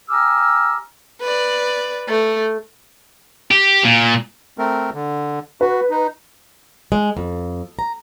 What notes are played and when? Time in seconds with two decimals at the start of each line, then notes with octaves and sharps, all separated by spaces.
0.10 G4 G#5 A#5 D6 E6 F6
1.21 B4 D5
2.08 A3
3.51 G4
3.84 A#2
4.58 A3 C4 A#4
4.94 D3
5.61 F#4 B4
5.90 D#4
6.92 G#3
7.17 F2
7.79 A#5